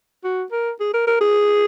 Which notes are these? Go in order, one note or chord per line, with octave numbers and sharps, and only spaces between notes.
F#4
A#4
G#4
A#4
A#4
G#4